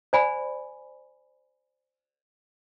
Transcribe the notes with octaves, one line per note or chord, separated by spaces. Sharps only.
C5 D5 G#5 B5